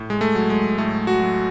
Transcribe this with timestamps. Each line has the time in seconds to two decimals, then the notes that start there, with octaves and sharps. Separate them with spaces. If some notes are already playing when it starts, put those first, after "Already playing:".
Already playing: A2
0.10 G#3
0.21 A3
0.35 F#3
0.50 G#3
0.78 A2 A3
1.07 F#4
1.21 F#3